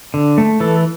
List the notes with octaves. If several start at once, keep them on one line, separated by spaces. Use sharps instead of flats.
D3
A3
E3 A4